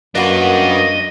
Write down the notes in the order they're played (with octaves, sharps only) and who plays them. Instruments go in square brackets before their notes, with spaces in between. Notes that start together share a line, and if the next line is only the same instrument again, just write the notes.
[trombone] F#2 [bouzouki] A#3 F#4 [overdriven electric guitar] D4 B4 [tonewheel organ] D#5